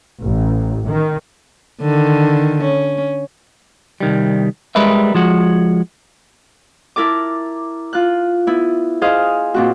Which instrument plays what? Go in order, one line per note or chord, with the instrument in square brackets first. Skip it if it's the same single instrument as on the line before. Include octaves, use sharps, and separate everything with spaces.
[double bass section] A1
D#3
[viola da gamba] D3 D#3
C#4
[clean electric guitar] C2 D#3 G3
G3 G#3 A#4 B4 D#5 E5
F3 G#3 F#4
[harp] E4 A#4 A5 D6
F4 F#6
B3 E4
G#4 C5 D#5 F5
A#2 C4 F#4